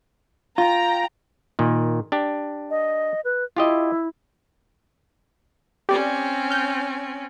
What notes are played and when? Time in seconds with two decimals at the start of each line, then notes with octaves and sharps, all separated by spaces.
0.58 F4 G5 A#5
1.59 A#2 D#3
2.12 D4 G4
2.70 D#5
3.25 B4
3.57 E4 F4 G4 D#5
5.89 C4 C#4 G4 D5
6.50 F6 G6